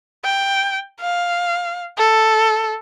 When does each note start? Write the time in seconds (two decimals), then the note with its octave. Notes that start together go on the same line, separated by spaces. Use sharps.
0.24 G5
1.01 F5
1.98 A4